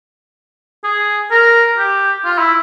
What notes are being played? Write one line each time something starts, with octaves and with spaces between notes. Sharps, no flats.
G#4
A#4
G4
F4
E4